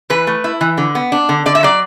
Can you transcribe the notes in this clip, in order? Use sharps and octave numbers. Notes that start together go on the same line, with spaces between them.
E3 B4
A3
E4
E3
D3
B3
D4
D3
D3 D5
E5
F#3 D5